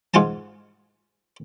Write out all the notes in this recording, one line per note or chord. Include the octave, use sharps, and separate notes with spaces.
G#2 F4 F#5 G#5 A5